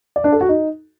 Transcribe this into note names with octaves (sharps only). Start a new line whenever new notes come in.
D5
D4
A4
F#4
D#4